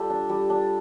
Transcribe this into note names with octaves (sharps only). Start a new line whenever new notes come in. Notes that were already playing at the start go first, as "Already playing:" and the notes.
Already playing: G3 F4 G4 A4
D4
G3
D4